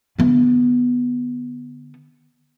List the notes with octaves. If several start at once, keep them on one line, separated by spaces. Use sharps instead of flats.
D3 B3